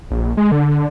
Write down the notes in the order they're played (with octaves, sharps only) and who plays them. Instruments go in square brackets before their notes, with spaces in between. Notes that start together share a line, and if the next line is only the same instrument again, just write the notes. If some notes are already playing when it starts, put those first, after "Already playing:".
[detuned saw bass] A#1
G#3
D3